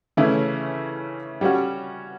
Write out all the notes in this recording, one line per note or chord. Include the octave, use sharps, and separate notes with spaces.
C#3 E3 A3 C#4 E4
G3 C#4 F#4